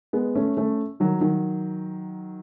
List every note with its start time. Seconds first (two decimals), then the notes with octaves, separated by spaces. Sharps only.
0.13 G#3 B3
0.35 A3 C#4
0.57 A3 C#4
1.00 D#3 F#3
1.21 D#3 F#3